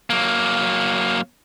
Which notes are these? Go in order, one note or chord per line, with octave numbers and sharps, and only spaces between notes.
F#3 A#3